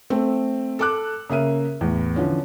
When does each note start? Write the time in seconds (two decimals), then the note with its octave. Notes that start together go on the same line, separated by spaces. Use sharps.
0.10 A3 C4
0.79 A4 D6 F#6
1.30 C#3 A#3 E5 D#7
1.81 E2 A2
2.16 D3 E3 F3 C#4